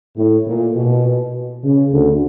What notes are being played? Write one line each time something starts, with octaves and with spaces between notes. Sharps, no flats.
A2
A#2
B2
C#3
D2 D3